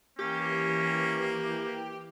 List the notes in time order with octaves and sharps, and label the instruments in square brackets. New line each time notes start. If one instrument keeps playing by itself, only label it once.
[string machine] E3 [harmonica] A#3 [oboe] C#4 [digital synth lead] G4